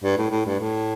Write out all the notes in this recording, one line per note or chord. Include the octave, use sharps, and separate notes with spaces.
G2
A2
A2
G2
A2